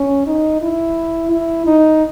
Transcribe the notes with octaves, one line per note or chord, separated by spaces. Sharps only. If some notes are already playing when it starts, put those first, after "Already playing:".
Already playing: C#4
D#4
E4
E4
D#4